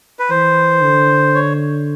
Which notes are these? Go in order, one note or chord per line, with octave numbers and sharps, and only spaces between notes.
B4
E3 C5
D3
C#5